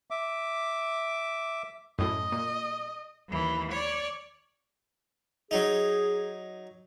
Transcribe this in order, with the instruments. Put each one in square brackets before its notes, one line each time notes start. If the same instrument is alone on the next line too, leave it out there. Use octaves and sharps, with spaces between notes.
[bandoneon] E5 D6
[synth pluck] F#2 A2 [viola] D#5
[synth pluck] A#2
[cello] D#2 E3
C#5 D5
[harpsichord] F#3 D#4 [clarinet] G#4